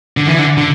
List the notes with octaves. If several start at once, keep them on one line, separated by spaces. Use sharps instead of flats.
D3
E3
D3
D3